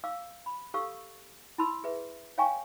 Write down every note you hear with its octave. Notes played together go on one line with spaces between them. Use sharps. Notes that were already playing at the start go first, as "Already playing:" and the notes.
F5 D6 E6
B5
G4 A4 F5 C#6 E6
E4 A5 B5 C6 E6
G#4 B4 E5
C#5 F5 G5 G#5 A#5 C#6